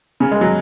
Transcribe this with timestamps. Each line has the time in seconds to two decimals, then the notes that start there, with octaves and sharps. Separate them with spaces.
0.20 C#3 C#4
0.31 G#3
0.41 F#3